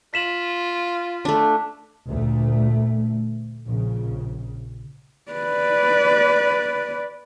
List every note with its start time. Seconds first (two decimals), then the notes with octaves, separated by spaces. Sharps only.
0.14 F4 B6 E7 F#7
1.25 A3 D4
2.09 D2 A#2 A3
3.66 A#1 C#3
5.31 B4 D5